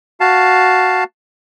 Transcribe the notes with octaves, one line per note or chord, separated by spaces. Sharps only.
F#4 F5 A5